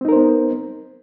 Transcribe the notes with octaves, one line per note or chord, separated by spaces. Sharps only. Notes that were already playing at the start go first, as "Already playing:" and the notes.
B3 C4 D#4 A#4 C5